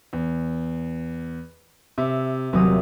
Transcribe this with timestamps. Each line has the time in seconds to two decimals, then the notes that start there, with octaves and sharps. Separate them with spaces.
0.13 E2
1.98 C3 E5
2.53 D#1 C3 F#3 D#6